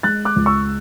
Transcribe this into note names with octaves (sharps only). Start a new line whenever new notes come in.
G#3 F#6 A6
D6 F#6
C#2
C#6 E6